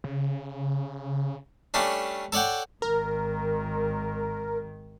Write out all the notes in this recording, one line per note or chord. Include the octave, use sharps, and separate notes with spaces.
C#3
G3 A3 C#4 D4
A4 C#5 D5 F#5 G5
G#1 D#3 A#4